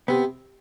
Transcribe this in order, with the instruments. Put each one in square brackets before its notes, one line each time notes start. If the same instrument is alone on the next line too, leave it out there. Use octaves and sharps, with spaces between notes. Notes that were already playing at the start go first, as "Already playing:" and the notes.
[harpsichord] C3 [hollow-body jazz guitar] B3